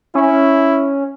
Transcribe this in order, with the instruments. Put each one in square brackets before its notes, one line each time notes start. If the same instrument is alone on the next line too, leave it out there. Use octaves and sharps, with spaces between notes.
[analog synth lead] C#4 [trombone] E4